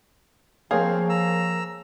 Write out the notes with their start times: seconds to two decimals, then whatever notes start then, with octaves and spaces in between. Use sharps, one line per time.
0.71 F3 A#3 C4 G#4 C#5 F5
1.09 A#5 E6